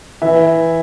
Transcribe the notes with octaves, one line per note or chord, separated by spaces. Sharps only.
E3 E5